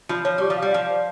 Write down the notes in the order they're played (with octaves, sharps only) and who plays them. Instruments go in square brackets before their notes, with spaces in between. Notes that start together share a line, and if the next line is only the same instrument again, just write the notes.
[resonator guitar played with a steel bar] F3 [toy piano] F4
[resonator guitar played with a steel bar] F3 [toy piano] C#5
[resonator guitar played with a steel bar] G3 [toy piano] G4
[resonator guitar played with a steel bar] F3
[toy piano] F5
[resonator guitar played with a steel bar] G3
[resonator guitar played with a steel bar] F3 [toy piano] F5
[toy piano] C5